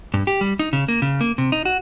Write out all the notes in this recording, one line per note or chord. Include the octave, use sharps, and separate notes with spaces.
G2
G4
G3
D#4
C#3
A#3
C#3
A#3
C3
D#4
F#4